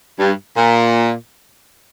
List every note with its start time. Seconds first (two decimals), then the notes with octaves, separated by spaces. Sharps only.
0.19 G2
0.57 A#2